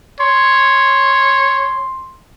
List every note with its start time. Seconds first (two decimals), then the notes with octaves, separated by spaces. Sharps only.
0.20 C#5 C6